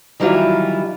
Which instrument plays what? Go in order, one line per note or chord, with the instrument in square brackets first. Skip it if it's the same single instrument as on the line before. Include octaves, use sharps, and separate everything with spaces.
[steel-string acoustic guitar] D#3 E3 F#3 G3 E4 F4